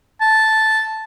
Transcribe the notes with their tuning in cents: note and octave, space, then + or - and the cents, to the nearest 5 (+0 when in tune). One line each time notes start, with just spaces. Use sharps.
A5 -5